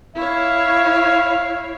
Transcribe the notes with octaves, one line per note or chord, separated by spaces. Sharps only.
E4 C#5 F5